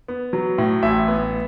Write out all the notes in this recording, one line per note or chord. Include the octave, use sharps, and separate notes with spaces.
B3
F#3
A2
A1 E5
B3